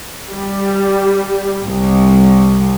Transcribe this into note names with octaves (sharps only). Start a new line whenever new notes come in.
G3
C2